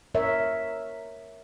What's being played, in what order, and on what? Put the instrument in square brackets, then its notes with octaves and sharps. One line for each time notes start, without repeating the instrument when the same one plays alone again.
[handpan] A#4 C#5 E5